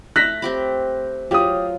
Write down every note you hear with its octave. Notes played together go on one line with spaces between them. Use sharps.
A3 F#6 A#6 B6
C4 G4 B5
F#3 F4 G4 D#6